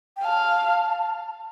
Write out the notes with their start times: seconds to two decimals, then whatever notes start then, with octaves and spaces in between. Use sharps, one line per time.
0.17 G5
0.24 F5 A5